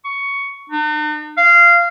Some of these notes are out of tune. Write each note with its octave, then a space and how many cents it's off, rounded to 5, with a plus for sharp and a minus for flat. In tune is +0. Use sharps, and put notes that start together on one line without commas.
C#6 +10
D#4 -45
F5 -15